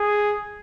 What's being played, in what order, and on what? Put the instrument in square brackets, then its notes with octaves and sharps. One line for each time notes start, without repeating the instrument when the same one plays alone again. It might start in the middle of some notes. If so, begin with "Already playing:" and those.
Already playing: [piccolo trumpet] G#4